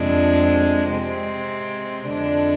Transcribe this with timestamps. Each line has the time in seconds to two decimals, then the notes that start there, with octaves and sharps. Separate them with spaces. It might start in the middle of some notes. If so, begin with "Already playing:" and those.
Already playing: F2 C3 G#3 D4
0.91 C3 G#3 C4
2.08 F2 D3 G#3 D4 A4